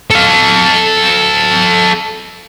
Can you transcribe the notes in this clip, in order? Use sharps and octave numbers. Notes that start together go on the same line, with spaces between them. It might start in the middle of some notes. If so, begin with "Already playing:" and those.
A4 F5